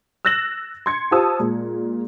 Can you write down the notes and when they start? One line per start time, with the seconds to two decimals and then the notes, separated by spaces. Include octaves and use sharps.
0.25 E6 F#6 A6 A#6 E7 F#7
0.86 C6 G#6 C#7
1.11 F4 G4 C5 A5 D#6 E6
1.39 A#2 G#3